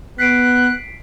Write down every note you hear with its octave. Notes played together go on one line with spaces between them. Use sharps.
B3 F#6 B6 C7 D7